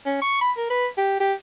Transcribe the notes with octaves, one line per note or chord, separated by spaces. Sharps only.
C#4
C#6
B5
A#4
B4
G4
G4